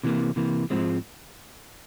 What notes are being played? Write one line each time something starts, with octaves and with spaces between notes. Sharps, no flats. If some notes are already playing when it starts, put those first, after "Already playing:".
C3 E3 A#3
C3 E3 A#3
G#2 F3 G#3 C4